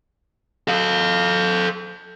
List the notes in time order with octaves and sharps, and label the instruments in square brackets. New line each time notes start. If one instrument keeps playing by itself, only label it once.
[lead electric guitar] A4 F5